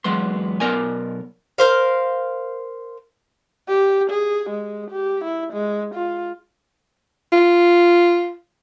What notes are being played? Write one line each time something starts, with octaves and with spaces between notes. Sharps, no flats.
E2 F#3 G#3 B3 C6
B1 B3 A#4 D5 G#5
A#4 C5 F5
G4
G#4
G#3
G4
E4
G#3
F4
F4